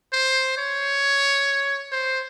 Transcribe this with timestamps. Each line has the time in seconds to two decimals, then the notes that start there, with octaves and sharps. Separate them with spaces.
0.13 C5
0.58 C#5
1.92 C5